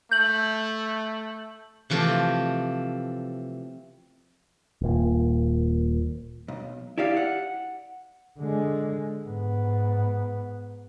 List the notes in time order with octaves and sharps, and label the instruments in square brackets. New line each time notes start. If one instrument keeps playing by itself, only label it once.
[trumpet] A3 [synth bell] G6 F#7
[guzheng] C3 E3 F3 A3 C4
[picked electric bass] D#1 A#2
[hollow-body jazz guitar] B1
E4 G4 D5 F5
F#5
[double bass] D3 G#3
G#2 B3